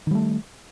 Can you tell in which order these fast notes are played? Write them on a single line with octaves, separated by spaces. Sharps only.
D#3 G3 A3